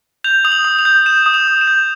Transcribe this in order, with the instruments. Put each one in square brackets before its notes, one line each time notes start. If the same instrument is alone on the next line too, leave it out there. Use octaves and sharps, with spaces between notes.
[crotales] G6 F7
D#6 F7
F#7
D#6
F7
G6
G6 E7
D#6
F7
D#6
E7
G6